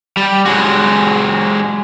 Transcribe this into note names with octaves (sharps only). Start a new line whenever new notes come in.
G3
F#3 G#3 F#4